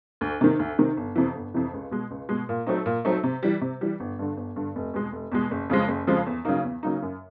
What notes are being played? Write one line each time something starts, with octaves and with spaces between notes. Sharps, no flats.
D2
C3 D#3
D2
C3 D#3
G1
F2 C3 E3
G1
F2 C3 E3
C#2
B2 G#3
C#2
B2 G#3
A#2
F#3 A3 C4 D#4
A#2
F#3 A3 C4 D#4
C3
E3 G3
C3
E3 G3
G1
G2 D3
G1
G2 D3
F1
E2 B2 G#3
F1
E2 B2 G#3
F#1
F2 C#3 F3 G#3
F#1
F2 C#3 F3 G#3
E2
C#3 F#3 A#3 D#4
E2
C#3 F#3 A#3 D#4
F#2